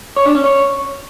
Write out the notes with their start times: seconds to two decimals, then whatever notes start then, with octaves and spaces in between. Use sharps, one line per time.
0.16 C#5
0.26 D4
0.35 C#4
0.44 C#5